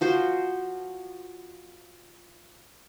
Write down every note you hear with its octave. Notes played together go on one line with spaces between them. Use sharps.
F3 F#4 C5